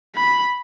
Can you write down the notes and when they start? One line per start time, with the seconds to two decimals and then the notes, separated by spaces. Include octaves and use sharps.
0.16 B5